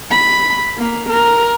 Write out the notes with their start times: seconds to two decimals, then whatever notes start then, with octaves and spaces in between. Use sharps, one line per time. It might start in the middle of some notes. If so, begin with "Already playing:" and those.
0.11 B5
0.78 A#3
1.09 A#4